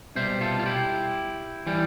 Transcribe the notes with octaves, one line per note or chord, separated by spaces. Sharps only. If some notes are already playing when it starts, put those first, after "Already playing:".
C2 B2 G3 C5 E5
F4 A4
F4
E4 G4
E3 G3